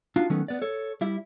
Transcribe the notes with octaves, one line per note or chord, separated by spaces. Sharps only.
D4 D#4 F4 F#4
D#3 F#3 A3 B3 C#4 D#4
B3 D5
A4 C#5
G3 E4 E5